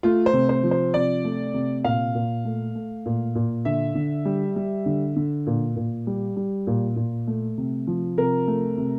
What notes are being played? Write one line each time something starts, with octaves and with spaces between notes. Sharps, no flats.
A3 F4
C5
C3
C5
F3
C5
C3 D5
A3
C3
A#2 F5
A#2
A3
A3
A#2
A#2
D3 E5
D3
G3
G3
D3
D3
A#2
A#2
G3
G3
A#2
A#2
A3
C3
F3
C3 A#4
A3
C3